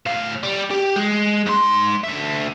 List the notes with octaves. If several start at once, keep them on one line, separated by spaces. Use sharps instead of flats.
A2 F5
G3
G4
G#3
G#2 C6
D3 E5